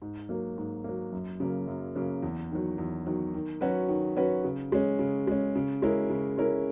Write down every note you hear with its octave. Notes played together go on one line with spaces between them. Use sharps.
G#2
F#3 A#3
G#2
F#3 A#3
F#2
C#3 F#3 A#3
F#2
C#3 F#3 A#3
E2
D#3 F#3
E2
D#3 F#3
D#3
F#3 C#4 F#4 B4
D#3
F#3 C#4 F#4 B4
C#3
G#3 C#4
C#3
G#3 C#4
C#3
G#3 C#4 E4 A#4
C#3
G#3 C#4 E4 A#4